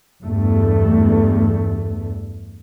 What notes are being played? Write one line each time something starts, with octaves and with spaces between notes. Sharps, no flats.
E2 G2 A3